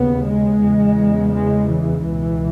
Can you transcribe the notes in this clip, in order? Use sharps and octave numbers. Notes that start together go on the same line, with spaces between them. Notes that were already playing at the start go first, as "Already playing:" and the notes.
Already playing: D#2 C#3 B3
G#3
E2 C#3
G#3
E3
C#2 B2